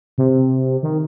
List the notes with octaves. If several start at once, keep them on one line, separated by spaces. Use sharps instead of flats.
C3
D#3